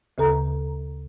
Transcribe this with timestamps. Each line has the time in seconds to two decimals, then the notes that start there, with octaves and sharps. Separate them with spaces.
0.18 D2 C#3 A4 A#5